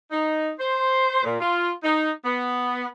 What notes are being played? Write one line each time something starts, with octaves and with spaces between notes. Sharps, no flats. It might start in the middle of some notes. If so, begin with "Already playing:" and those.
D#4
C5
A#2
F4
D#4
B3